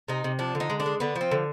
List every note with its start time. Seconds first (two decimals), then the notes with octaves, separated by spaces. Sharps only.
0.08 C3 D#4
0.24 C3
0.39 F3 D4
0.55 D3
0.60 D#4
0.70 G#3
0.80 D4
0.86 G#3
1.00 D3 B3
1.16 F3
1.21 C4
1.31 D3